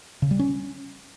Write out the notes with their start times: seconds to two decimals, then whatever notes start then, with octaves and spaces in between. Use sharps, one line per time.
0.22 C#3
0.31 G3
0.39 C#4